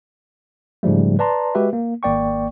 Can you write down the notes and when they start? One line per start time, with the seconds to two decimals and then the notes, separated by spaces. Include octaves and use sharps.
0.83 G#2 C#3 F3 G3 A3
1.19 B4 D5 A5 A#5 C6
1.55 G#3 F#4 G4 B4 E5
1.73 A#3
2.03 G#1 A#3 D5 G5 C#6